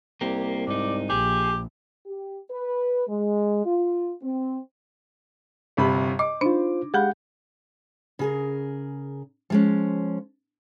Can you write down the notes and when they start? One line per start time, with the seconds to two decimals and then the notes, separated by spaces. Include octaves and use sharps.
0.21 C2 A#3 G4
0.67 G#2 D#4 D5
1.10 A#1 G4 G#4
2.06 G4
2.51 B4
3.07 G#3
3.65 F4
4.22 C4
5.77 G1 C3 B5
6.19 D#5 D6
6.41 D4 D#4 F4 C5
6.94 G#3 G4 G#4 F#5 B5 G6
8.19 C#3 G#4 A#4
9.50 F3 G#3 C#4